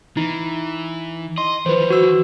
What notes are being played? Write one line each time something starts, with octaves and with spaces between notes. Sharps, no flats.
E3 D#4
D#5 C6
E3 F3 B4 C5
F#4 E6